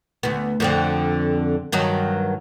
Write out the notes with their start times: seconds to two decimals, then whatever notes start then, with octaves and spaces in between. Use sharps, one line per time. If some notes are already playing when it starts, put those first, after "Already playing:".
0.23 D2 B3
0.60 F2 D3 C4
1.72 G2 D#3 F#3